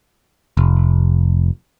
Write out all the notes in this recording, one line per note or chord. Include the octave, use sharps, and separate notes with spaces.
F1